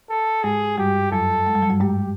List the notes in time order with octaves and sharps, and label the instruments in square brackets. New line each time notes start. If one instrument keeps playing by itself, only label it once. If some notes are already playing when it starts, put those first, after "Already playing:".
[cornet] A4
[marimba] G#2 G#3 [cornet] G#4
[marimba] G2 G3 [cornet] G4
[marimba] F#2 F#3 [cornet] A4
[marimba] G#3
G3
F#3
G2 G3
[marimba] G#2 G#3 [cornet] G4